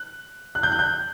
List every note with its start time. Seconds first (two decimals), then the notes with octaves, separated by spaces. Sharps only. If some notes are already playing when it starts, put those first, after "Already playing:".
Already playing: F#6
0.55 F#6
0.63 G6
0.72 F#6
0.79 G6